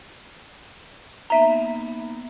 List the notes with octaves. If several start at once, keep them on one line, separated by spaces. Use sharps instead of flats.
A#3 B3 D#4 E5 A#5